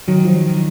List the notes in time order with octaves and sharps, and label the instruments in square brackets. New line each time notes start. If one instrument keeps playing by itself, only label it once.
[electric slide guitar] D#3 [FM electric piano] F#3
[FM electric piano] F3
F#3
[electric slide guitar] D#3